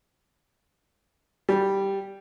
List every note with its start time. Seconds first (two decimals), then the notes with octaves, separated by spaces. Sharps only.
1.49 G3